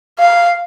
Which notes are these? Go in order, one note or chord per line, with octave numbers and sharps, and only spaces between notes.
F5